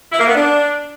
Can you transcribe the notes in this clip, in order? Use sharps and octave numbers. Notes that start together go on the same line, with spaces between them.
E4
A#3
B3
D4